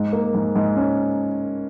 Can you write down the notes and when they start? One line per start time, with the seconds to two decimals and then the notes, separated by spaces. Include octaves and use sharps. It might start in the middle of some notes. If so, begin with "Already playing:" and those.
Already playing: G#2
0.13 A#3
0.35 G#2
0.56 G#2
0.76 C#4